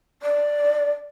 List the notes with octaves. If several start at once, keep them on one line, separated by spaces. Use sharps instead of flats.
D5